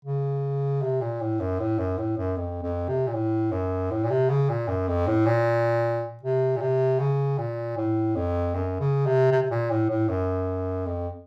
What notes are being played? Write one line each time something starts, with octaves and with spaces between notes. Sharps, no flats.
C#3
C3
A#2
A2
F#2
A2
F#2
A2
F#2
F2
F2
C3
A#2
A2
F#2
A2
A#2
C3
C#3
A#2
F#2
F2
A2
A#2
C3
A#2
C3
C#3
A#2
A2
F2
F#2
C#3
C3
C3
C3
A#2
A2
A2
F#2
F2